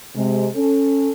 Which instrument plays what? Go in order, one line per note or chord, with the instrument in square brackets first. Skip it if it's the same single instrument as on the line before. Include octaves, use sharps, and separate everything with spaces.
[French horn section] C3 G#3
C#4 A4